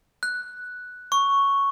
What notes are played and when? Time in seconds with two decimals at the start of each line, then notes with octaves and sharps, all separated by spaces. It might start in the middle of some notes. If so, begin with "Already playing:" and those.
0.23 F#6
1.12 C#6